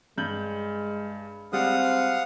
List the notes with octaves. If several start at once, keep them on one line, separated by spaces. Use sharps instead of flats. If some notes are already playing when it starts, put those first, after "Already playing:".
G2 G#3 G6 F#7
G3 G#3 C4 F5 F#5 D#6